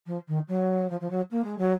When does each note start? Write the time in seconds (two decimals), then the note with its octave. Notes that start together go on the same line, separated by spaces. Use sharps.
0.07 F3
0.28 D#3
0.49 F#3
0.90 F3
1.01 F3
1.10 F#3
1.31 A#3
1.44 G#3
1.59 F#3